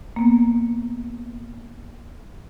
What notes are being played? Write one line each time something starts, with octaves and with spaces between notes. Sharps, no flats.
A#3 B3